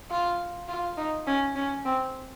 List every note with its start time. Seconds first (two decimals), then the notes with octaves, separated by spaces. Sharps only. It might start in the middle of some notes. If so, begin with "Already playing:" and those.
0.11 F4
0.68 F4
0.97 D#4
1.27 C#4
1.56 C#4
1.85 C4